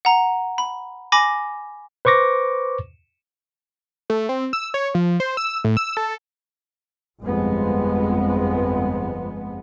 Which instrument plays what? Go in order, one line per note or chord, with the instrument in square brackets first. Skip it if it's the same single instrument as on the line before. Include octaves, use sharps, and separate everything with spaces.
[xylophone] F#5 A#5
B5
G#5 B5 D6 A#6
[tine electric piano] B4 C5 C#6 D6 A#6
[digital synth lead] A3
C4
E6
C#5
F3
C5
E6
A2
E6
A4
[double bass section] G1 F2 G#3 B3